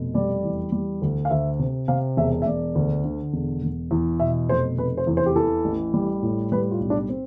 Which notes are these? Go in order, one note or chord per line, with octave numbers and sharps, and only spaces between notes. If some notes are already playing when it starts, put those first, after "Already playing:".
Already playing: F1 B2
G3 D5
E2
G3
D2
F5
D2 E5
C3
C3 F5
E1 E5
E5
E1 D5
D2
D3
E1
E1
E2
B2 E5
F1 C5
F1 B4
C5
E2
C5
G4
E3 A4
A1
G3
A2
G3 B4
F4
B1
D4
C4